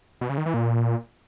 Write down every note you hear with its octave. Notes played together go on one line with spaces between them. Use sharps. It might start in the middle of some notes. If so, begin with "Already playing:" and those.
B2
C#3
D#3
E3
A#2